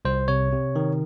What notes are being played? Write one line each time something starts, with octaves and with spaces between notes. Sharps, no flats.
C2 C5
C3 C#5
C3
D#3